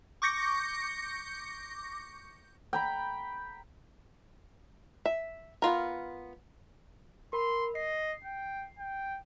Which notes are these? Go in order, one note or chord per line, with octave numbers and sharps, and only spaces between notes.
C#6 D6 G6 A#6 C#7
G5 A#5 B5
E5
B3 F4 A#4
A#4 B5 C6
D#5 C7
G5
G5